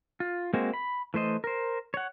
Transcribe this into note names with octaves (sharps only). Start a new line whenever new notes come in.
F4
G#3 A#3 C4 F#4
B5
E3 A3 C5 D#5
A#4 C5
C#5 F#5